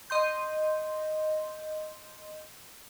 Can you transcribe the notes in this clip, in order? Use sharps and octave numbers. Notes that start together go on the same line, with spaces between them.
D#5 C6 G6